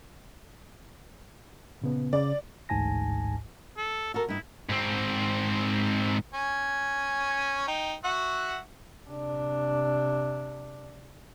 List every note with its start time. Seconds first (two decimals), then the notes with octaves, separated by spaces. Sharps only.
1.82 A#2 C#3 B3
2.13 C#3 D5
2.69 A1 D2 G#2 G#5 A5 A#6
3.77 A4
4.14 F#4 A4 A#4
4.29 G2 D#4 E4
4.69 G#2 C4
6.34 C#4 G#5
7.68 D#4 G5
8.04 F#4 E5 F#5
9.09 C3 D4